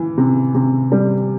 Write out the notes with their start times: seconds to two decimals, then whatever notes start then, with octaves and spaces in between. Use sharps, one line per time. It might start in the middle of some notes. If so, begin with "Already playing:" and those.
Already playing: E3
0.18 C3
0.55 C3
0.92 G3